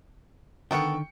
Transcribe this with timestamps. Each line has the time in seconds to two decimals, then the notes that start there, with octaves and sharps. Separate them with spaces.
0.71 D3 D#3 B3 A4 A#4 G5 C#6 C#7